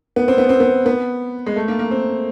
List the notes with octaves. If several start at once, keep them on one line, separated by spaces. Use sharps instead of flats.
B3
C4
B3
C4
B3
B3
G#3
A3
A#3
A#3
C4